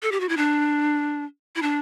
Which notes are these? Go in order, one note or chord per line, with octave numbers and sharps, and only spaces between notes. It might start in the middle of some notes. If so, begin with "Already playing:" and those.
A4
G4
F#4
E4
D4
E4
D4